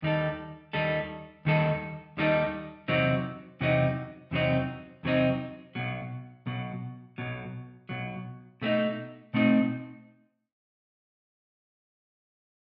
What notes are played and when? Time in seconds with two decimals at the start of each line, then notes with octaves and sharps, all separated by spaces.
0.02 D#2 D#3 G3 D#4 A4
0.73 D#2 D#3 G3 D#4 A4
1.45 D#2 D#3 G3 D#4 A4
2.17 D#2 D#3 G3 D#4 A4
2.88 E2 C3 F#3 C4 D#4
3.61 E2 C3 F#3 C4 D#4
4.31 E2 C3 F#3 C4 D#4
5.03 E2 C3 F#3 C4 D#4
5.75 B1 B2 F#3
6.46 B1 B2 F#3
7.18 B1 B2 F#3
7.89 B1 B2 F#3
8.62 B2 A3 C4 D#4
9.34 B2 A3 C4 D#4